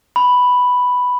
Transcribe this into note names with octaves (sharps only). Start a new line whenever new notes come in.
B5